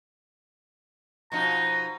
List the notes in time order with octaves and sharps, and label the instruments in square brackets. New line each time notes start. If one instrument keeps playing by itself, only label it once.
[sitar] B2 F3 D#4 [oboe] A#5